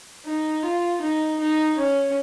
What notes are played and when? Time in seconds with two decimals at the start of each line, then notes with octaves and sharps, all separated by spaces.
0.25 D#4
0.63 F4
1.01 D#4
1.39 D#4
1.78 C#4